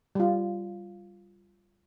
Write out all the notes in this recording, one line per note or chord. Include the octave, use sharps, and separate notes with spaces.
G3 F4